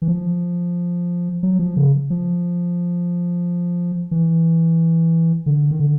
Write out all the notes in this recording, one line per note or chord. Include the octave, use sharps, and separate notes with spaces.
E3
F3
F#3
F3
C#3
F3
E3
D3
D#3
D3